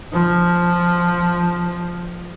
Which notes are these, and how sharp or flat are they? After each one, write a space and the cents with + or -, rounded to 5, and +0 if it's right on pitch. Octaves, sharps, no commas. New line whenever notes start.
F3 +0